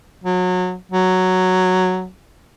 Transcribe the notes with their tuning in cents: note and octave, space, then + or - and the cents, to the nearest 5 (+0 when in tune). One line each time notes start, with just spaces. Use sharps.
F#3 -25
F#3 +0